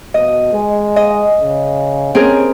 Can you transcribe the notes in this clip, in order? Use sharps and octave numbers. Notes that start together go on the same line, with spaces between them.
B2 D#5
G#3
D#5
C#3
C4 C#4 G#4 A#4